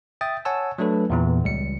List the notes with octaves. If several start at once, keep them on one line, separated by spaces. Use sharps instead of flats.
E5 G5 D#6 A6
C#5 F#5 G#5 A5 E6
F#3 A3 D4 A4 B4
E2 A#2 E3
C#2 G3 C#7